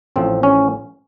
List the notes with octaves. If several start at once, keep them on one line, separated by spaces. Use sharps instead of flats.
A1 A2 F3 C4
C#4